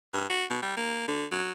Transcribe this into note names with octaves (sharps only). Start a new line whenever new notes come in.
G2
F#4
B2
G3
A#3
D3
F#3